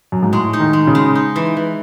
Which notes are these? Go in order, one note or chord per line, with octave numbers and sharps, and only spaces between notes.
F#2
G#2
A2 G#3
D#4
D#3
G#3
C#3
G#3
D#4
E3
E3